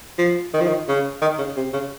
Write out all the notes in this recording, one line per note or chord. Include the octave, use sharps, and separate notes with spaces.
F3
D#3
F3
D#3
C#3
D#3
C#3
C3
C#3